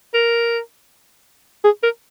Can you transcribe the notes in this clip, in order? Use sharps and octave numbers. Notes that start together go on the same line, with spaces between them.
A#4
G#4
A#4